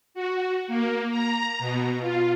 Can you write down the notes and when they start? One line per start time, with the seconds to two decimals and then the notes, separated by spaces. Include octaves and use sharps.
0.14 F#4
0.68 A#3
1.11 A#5
1.59 B2
2.01 F4